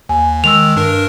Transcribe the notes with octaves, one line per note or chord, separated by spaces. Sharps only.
D#2 G#5
D#3 G#3 E6 F7
G2 D4 A#4